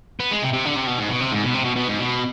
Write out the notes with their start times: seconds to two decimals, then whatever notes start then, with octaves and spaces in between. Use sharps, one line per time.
0.20 B3
0.31 G#3
0.42 C3
0.53 C3
0.65 D3
0.76 C3
0.87 B2
0.98 G#2
1.09 B2
1.21 C3
1.32 G#2
1.42 B2
1.54 C3
1.64 B2
1.76 B2
1.87 G#2
1.99 B2